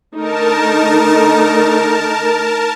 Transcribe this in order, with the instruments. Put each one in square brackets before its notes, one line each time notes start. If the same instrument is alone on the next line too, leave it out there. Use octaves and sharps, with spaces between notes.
[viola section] D3 A3 D#4 [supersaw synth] A#4 A5